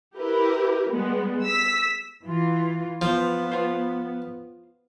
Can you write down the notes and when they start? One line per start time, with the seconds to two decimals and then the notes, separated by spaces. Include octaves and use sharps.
0.18 E4 G4 A#4 B4
0.90 G3 G#3 B3
1.43 E6 B6
2.24 E3 F4
3.01 F3 B3 F4 C5
3.51 F4 C5